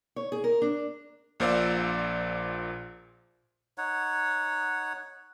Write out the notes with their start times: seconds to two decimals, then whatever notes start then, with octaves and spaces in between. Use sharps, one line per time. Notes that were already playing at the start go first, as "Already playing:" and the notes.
0.16 C#5
0.32 G#4
0.44 A#4
0.62 D4
1.40 A#1 A#2 C5 D5 F5 E6
3.78 D#4 C#5 F#5